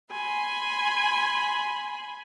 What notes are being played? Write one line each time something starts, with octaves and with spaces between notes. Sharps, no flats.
G#5 B5 C6